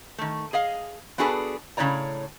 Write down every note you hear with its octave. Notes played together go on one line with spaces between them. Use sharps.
D#3 A3
G#4 D#5 F5
B3 D4 F#4 G#4 A4 B4
A2 C#3 D#4 C#5 D5 A#5